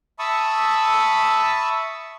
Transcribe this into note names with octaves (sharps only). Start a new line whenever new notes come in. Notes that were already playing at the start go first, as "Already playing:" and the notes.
E5 A5 B5 C#6 D#6 E6